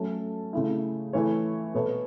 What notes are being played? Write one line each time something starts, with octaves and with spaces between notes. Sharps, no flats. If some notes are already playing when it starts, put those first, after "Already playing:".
Already playing: F#3 A3 C#4 A4
C#3 A3 E4
E3 A3 E4 C#5
B2 B3 A4 C#5